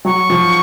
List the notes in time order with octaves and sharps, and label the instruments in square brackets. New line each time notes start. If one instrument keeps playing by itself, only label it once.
[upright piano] F#3 [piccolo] C#6
[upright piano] F3